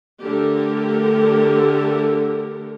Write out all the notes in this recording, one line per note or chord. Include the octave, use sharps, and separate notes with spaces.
D3 A3 G4 A#4